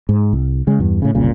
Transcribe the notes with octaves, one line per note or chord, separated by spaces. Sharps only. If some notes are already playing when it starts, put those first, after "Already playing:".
G#2
C2
C#3 G#3
E2 G2
A2 C#3
F#1 C2 A#2 C#3